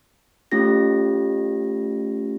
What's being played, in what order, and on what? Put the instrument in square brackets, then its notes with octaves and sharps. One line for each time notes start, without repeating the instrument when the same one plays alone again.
[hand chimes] A3 C#4 F4 G4 A#6